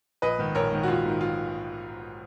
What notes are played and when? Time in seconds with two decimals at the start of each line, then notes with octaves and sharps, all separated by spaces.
0.22 A#1 B4 D#5
0.38 G#2 D#3
0.55 A#1 A#4 C#5
0.72 G#2 D#3
0.83 F#4
0.88 A#1 F4
1.04 G#2 D#3
1.21 F4